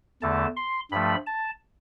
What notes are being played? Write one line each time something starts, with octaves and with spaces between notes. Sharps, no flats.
E2 D3 A3 A5
C6
G2 F3 A3 B5
A5